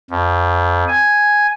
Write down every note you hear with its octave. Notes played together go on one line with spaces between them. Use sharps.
F2
G#5